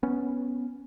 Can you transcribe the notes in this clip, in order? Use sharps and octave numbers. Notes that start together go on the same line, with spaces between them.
B3 C#4